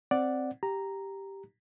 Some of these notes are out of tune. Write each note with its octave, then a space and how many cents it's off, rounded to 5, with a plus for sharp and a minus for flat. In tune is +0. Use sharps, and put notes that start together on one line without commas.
C4 +5 D5 +0 F#5 +0
G4 +0 A#5 +0